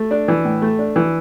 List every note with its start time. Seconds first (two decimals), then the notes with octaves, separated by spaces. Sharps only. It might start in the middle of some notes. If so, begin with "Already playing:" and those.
Already playing: A3
0.11 D4
0.28 E3
0.45 A2
0.62 A3
0.79 D4
0.96 E3